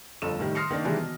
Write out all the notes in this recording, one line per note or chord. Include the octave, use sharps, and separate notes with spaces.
G1 F2 A4 E7
A2 D#3 G3
C6 D#6 F6 A#6 C7 C#7
D#3 A#3 D4
C3 D#3 E3 G#3 D4
B2